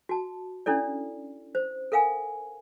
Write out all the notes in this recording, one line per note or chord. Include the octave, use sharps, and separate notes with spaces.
F#4 A5
C#4 D4 E4 A4 D5
C5
A4 A#4 F5 F#5 G#5